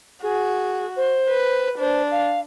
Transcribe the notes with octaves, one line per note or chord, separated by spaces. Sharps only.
F#4 G#4
C5
B4
D4 C5
F5